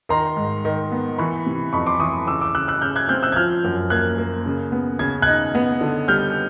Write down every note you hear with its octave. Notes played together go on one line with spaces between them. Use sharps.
D#3 A#5 C6
G#2
D#3
B3
E3 B5 C#6
C3
F2 B5 C#6
C6 D6
E3 C#6 D#6
C#3 D6 E6
D6 E6
C#3 E6 F#6
E6 F#6
C#3 F6 G6
F#6 G#6
C4 F6 G6
E6 F#6
G#6
F3 F6 G6
F#2
A#3 F#6 G#6
A#3
C#3
B3
C#3 G#6
D#4 F#6 G#6
B3
D3
G3 F6 G6